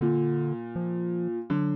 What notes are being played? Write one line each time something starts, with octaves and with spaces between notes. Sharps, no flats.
A#2 D3
F3
D3 F#3